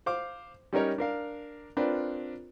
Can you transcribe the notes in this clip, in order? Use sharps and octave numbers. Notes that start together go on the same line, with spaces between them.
C5 F5 D6
G3 C#4 D#4 A#4 C#5
D4 A#4 F5
C4 D4 F4 A#4 B4